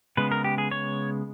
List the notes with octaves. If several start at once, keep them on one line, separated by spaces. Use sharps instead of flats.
C#3 G#3 B3 B4
A#4
G4
G#4
C#5